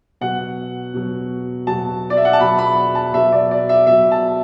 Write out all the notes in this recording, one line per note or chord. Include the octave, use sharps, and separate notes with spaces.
B2 F#3 F#5
B2 F#3
B2 F#3 A5
D5
E5
F#5
A5
B2 F#3 B5
B5
A5
B2 F#3 E5
D5
D5
E5
B2 F#3 E5
A5